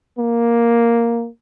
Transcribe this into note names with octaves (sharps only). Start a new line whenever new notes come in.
A#3